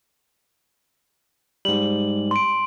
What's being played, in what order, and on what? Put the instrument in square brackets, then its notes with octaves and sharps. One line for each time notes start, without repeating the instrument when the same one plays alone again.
[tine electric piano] G#2 G3 [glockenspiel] F#7
[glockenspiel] C6 D7